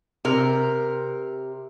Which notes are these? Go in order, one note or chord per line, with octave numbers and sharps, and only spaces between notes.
C3 A#4